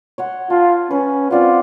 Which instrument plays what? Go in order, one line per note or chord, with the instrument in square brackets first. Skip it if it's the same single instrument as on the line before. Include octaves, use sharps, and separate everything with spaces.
[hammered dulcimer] C#5 F#5 C6
[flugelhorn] F4 [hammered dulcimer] A5
[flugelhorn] C#4 [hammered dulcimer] B4
[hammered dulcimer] C4 D5 F#5 [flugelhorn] F4